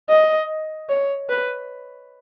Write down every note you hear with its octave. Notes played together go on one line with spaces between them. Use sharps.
D#5
C#5
B4